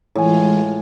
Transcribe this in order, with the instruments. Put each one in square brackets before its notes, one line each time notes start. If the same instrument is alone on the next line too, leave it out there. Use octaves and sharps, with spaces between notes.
[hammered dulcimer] A2 G#5 [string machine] E3 G#3 F4